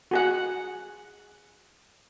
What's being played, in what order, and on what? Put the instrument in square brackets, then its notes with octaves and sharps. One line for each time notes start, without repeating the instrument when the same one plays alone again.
[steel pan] F#4 G#4 F#5